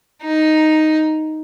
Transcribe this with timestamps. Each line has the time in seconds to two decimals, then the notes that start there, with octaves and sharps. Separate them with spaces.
0.22 D#4